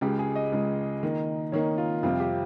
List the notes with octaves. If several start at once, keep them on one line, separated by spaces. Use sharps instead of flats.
C#2 C#3 G#3 G4
G#4
D#5
C#2 C#3 G#3
D#3 A#3 D#4
D#3 A#3 D#4 C#5
F4
F2 C3 G3 C4 F4
G4